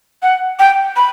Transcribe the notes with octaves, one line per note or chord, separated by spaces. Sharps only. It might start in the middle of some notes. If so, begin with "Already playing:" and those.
F#5
G5
B5